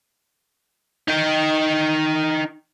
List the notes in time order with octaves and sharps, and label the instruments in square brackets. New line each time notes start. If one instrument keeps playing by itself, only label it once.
[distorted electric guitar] D#4 G5